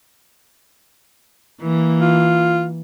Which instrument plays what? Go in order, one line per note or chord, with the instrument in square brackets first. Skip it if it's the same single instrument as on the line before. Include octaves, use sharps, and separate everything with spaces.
[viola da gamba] E3 A#3
[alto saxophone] F4